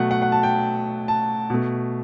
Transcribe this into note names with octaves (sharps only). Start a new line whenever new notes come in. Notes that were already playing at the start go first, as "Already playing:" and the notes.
Already playing: B2 F#3 A3 F#5
F#5
F#5
A5
G5
A5
B2 A3